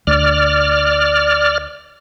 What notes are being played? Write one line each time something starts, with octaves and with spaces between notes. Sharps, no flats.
D2 D5 F6